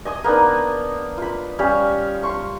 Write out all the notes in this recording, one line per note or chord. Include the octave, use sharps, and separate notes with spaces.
D#5 G#5 D#6
A#3 B3 D4 D#4
F4 B5
G3 C#4 F5
C6 C#6